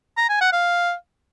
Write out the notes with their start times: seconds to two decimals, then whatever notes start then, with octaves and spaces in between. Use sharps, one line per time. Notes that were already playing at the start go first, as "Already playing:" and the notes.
0.18 A#5
0.29 G#5
0.41 F#5
0.53 F5